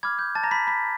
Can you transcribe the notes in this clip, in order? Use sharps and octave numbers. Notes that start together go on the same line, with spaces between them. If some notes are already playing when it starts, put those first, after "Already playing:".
B5 D6 F6 G#6
G6
A5 A6
A#5 A#6
B5 B6
B5 B6